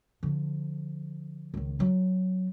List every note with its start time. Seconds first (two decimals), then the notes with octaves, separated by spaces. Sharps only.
0.23 D3 F3
1.54 C#2 D#3
1.79 F#3 C4